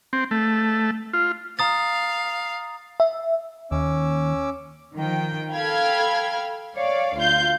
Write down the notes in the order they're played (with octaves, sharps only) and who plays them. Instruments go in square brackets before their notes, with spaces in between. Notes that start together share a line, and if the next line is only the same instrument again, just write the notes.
[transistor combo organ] C4
A3
F4
[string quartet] F5 [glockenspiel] A#5 D#6 A6
[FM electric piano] E5
[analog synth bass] D#2 [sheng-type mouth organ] C#4 D6 E6
[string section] D#3 F3 G5
A4 F5 G5 B5 F6 G#6
C#5 D5 F5
D2 F4 F5 G6